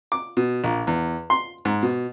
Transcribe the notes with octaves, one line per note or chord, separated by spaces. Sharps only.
D6
B2
A#1
E2
C6
G#2
B2